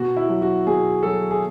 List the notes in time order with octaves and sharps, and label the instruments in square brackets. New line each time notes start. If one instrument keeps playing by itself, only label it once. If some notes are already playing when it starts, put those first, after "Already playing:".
Already playing: [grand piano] B2 F#4
E4
F#3
F#4
B2 G#4
F#3 A4
G#4